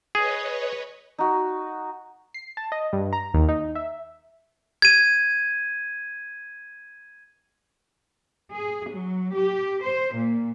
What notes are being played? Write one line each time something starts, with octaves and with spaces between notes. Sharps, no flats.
G#4 B4 C#5 D#5
D#4 F#4
C7
A5
D#5
G2
A#5
D#2
D#4
E5
G#6 D#7
G#4
F#3
G4
C5
A#2